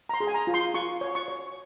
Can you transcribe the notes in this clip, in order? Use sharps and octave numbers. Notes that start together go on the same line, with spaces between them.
A#5
C6
G#4
G#5
A#5
F4
C6
F4 C#6
C#5
C#6
C#5